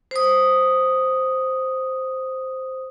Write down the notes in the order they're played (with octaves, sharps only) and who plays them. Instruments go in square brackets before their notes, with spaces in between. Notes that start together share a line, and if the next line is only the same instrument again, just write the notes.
[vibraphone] C5 D#6